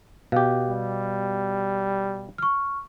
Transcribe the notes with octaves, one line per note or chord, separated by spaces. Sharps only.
B2 G4 F5
G3
C#6 F6